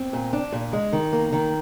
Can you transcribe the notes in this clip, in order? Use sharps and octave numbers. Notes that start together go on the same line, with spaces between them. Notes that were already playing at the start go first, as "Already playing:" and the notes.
Already playing: C4
A#2
D4
A#2
G#3
D#3
A#3
D#3